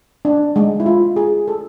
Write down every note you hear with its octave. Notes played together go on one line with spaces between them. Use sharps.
D4
G#3
E4
F4
G#4
A4